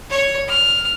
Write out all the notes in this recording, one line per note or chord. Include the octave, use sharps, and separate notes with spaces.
C#5
F6